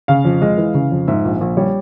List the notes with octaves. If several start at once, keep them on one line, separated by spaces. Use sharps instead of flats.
C#3 F5
F2
G#3
E3
C#3
F2
G#2 E5
A#1
A#1
G3 C#5